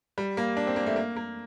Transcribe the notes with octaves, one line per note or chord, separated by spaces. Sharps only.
G3
A#3
D4
C4
A#3
A3
A#3
A#3